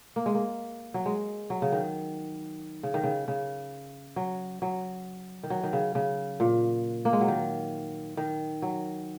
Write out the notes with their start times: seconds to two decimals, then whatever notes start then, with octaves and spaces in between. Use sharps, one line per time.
0.16 A#3
0.26 G#3
0.35 A#3
0.94 F#3
1.06 G#3
1.50 F#3
1.62 C#3
1.72 D#3
2.83 C#3
2.94 D#3
3.04 C#3
3.28 C#3
4.16 F#3
4.62 F#3
5.43 D#3
5.50 F#3
5.63 D#3
5.73 C#3
5.95 C#3
6.40 A#2
7.05 A#3
7.13 G#3
7.21 F#3
7.28 D#3
8.17 D#3
8.62 F#3